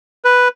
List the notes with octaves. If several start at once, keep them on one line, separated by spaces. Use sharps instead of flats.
B4